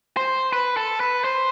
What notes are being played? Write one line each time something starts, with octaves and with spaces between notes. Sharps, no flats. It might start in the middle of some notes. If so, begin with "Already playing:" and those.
C5
B4
A4
B4
C5